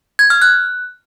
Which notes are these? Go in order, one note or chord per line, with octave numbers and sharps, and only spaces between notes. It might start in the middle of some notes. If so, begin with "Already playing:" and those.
G#6
F6
F#6